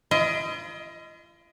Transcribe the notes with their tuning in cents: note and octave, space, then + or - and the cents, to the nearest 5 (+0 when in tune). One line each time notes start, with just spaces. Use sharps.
F4 -45 D#5 +20